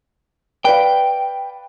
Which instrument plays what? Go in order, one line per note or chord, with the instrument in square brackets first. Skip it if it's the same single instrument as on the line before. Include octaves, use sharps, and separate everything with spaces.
[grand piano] B4 D5 F5 [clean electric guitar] G5